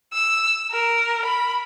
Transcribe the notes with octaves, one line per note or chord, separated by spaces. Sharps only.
E6
A#4
B5